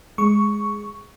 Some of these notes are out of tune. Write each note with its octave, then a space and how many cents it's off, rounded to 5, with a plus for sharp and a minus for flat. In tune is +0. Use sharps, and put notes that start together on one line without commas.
G#3 +0 C#6 +5